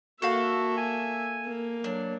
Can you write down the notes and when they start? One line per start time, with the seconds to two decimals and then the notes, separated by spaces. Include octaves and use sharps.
0.22 A#3 F#4 A4 E5 F5 F#6
0.77 G#5
1.46 A#3
1.84 F#3 D4